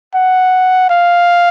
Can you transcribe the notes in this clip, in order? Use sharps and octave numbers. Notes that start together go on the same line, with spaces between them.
F#5
F5